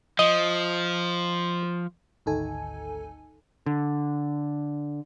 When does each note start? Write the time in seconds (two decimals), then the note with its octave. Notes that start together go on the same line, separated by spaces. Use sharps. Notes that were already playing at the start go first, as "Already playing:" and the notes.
0.19 F3 D#5
2.26 G#1 D2 D#4 A4 G#5
3.66 D3